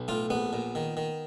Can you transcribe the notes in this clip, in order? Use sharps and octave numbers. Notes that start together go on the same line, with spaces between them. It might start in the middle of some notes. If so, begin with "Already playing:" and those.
Already playing: B1
A2 F4
A#1 B3
A#2
D#3
D#3